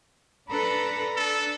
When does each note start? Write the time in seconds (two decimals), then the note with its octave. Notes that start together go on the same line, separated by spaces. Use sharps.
0.50 D4 A4 B4 A#5 B5
1.16 D4 A4